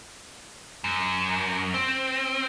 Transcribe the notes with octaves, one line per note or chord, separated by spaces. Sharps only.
F#2
C4